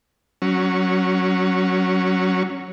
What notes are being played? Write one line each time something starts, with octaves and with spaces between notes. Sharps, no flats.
F#3 C#4